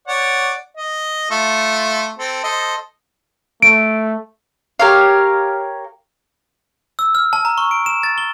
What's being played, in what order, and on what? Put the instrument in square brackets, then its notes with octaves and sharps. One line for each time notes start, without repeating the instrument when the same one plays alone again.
[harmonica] C#5 D5 F#5
D#5
A3 F4 A4
C4 A4
A4 C5 D#5
[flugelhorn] A3 [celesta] D7
[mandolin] G4 A#4 C#5 F5
[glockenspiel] E6
F6
A5
A#5
C#6
D7
E7
A6
G7